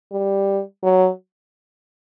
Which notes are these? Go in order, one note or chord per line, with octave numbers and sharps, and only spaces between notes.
G3
F#3